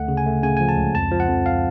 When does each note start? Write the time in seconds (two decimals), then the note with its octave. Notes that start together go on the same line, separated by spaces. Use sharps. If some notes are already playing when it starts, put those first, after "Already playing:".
Already playing: D2 A3 F#5
0.08 C#3
0.17 G#5
0.26 A3
0.43 C#3 G#5
0.57 F3 G#5
0.69 A5
0.77 C#2
0.95 F2 A5
1.11 F3
1.20 F#5
1.28 F2
1.46 F5